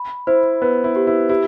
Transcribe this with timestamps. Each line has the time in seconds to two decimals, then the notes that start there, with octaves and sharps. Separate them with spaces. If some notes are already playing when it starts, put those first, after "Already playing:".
Already playing: B5
0.27 E4 C5
0.62 B3 B4
0.84 E4
0.96 G4
1.07 E4
1.29 E4 G4